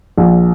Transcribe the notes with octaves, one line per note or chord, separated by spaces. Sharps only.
A#1